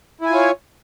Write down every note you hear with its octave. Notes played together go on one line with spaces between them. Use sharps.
E4 F4 C#5 G#5